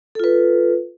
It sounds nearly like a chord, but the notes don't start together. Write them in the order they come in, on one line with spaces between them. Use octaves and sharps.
A4 F4 B4